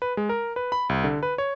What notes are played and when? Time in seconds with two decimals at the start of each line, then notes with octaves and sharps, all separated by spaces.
0.02 B4
0.17 G#3
0.29 A#4
0.56 B4
0.72 B5
0.89 C2
1.04 D3
1.23 B4
1.38 C#5